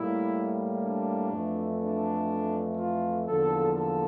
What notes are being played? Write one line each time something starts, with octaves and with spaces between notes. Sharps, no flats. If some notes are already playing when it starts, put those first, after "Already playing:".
Already playing: A2 G3 A#3 E4
D4
F2 E3 A3
D4
F4
E2 D3 F3 A#3 A4
A4